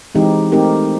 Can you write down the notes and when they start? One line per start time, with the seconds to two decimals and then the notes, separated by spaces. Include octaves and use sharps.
0.15 E3 G#3 C4 D#4 G4
0.52 A3 C4 D#4 G4 A#4